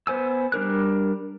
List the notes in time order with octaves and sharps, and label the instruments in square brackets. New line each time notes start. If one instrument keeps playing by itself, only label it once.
[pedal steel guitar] B3 C5 G#5 E6
G3 D4 A#4 F#6